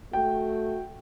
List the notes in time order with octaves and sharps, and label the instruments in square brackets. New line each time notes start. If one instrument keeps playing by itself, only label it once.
[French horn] A3 [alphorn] F#4 [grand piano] G5